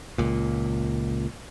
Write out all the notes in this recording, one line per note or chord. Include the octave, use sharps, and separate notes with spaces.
C#2 A#2